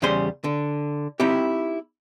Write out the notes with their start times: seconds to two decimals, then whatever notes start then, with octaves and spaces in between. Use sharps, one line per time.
0.02 E2 C#3 G3 G#4 C5 C6
0.44 D3
1.20 C4 D#4 E4 G4